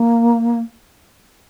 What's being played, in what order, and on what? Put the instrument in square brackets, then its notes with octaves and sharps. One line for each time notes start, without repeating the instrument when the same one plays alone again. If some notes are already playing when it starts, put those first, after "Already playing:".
Already playing: [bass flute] A#3